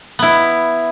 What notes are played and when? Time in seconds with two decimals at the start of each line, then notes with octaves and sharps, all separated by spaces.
0.19 B3 E4